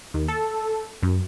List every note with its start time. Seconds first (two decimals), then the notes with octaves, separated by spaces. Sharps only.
0.14 D#2
0.28 A4
1.03 F#2